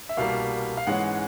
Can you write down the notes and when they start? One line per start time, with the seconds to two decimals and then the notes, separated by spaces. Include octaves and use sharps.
0.09 E5
0.17 C2 B2 G3 A#3 F5
0.77 F5
0.87 G#2 E3 G#3 C#4 F#5